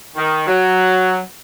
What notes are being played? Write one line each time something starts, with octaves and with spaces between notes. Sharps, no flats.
D#3
F#3